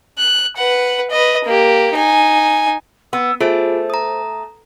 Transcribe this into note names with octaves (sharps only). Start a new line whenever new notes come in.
F#6
B4 F#5
B4 D#5
A#3 G4
D#4 G#5
B3 E6
A3 F4 G#4 C5
A#5 D#6